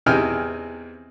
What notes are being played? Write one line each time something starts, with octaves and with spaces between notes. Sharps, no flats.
E2 C3 D#4 G5 G#5 F6